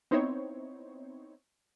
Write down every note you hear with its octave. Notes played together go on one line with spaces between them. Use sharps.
B3 C4 D#4 E4 C5 C#5